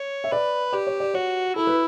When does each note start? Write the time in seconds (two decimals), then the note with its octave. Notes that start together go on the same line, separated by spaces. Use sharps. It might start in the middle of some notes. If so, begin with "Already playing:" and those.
Already playing: C#5
0.24 E5
0.32 B4 D5
0.73 G4 D5
0.87 C#5
1.00 D5
1.14 F#4 C#5
1.56 E4 A4
1.67 B4